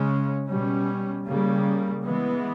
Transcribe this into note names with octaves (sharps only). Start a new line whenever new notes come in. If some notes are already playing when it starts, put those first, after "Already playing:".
Already playing: C#3 G#3 C#4
B2 G3 C#4
C#3 G3 A#3
E3 G#3 B3